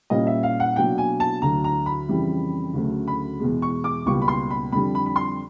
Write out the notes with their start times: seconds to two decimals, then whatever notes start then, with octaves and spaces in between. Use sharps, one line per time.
0.10 A#2 G3 A#3 C#4 D#5
0.27 E5
0.43 F5
0.60 F#5
0.76 B2 F#3 A#3 D4 G5
0.98 G#5
1.20 A5
1.42 D2 D3 F#3 A#5
1.64 A#5
1.86 B5
2.09 F2 C#3 E3 G3
2.74 D2 C#3 F#3 A3
3.08 B5
3.40 E2 B2 G#3
3.62 C#6
3.84 D6
4.06 C#2 B2 G3 A#3 C#6
4.22 B5
4.28 C6
4.50 B5
4.72 F2 D3 G3 B5
4.95 B5
5.06 B5
5.16 C6